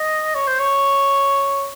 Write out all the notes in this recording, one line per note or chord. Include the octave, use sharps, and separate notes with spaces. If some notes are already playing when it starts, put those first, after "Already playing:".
Already playing: D#5
C#5
C5
C#5